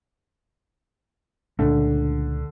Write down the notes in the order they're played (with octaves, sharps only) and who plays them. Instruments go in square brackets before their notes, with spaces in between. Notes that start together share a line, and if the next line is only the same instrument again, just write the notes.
[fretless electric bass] C#2 A#2 A3 [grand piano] D3